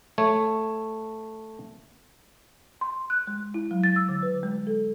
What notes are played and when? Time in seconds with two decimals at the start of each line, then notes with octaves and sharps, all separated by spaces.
0.18 A3 C#5
2.81 C6
3.10 F#6
3.27 G#3
3.54 E4
3.71 F#3
3.84 A6
3.96 E6
4.09 D3
4.22 B4
4.43 G#3
4.67 A4